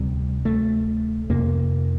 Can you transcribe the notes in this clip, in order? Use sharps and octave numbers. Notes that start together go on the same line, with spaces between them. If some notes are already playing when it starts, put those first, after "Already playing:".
Already playing: D2 C3 G3
A3
F2 C3 A#3